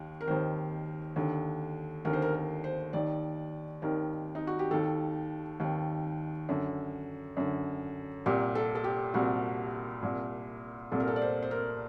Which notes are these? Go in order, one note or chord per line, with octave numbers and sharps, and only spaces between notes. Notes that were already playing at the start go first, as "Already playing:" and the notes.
Already playing: D#2 D#3
A#4
D#2 D#3 C5
D#2 D3
D#2 D3 A#4
C5
A#4
A#4
C5
D#2 D#3 D5
D#2 D#3 A#4
D#4
F#4
G4
D#2 D#3 A4
D#2 D#3
F#2 D3
F#2 D3
C2 A#2 G4
A4
A4
G4
C2 A#2 F#4
C2 A#2
C2 A#2 A4
A#4
A4
D5
C5
C5
A#4